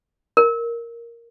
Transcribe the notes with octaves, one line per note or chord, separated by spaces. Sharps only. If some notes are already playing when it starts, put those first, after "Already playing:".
A#4